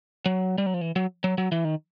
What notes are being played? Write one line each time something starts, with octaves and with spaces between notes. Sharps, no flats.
F#3
G3
F#3
F3
E3
F#3
F#3
F#3
E3
D#3